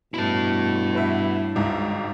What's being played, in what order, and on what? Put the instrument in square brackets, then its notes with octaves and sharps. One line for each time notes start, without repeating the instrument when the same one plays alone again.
[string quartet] G2 [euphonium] B2 [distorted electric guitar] E4 A5
[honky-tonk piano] B4 E5 F#5
G#1 C#2 G#2